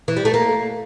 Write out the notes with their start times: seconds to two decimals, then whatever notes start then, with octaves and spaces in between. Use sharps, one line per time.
0.08 E3
0.17 G3
0.25 A3
0.34 A#3